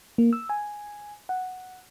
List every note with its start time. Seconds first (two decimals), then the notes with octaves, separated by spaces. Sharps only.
0.18 A#3
0.33 E6
0.49 G#5
1.29 F#5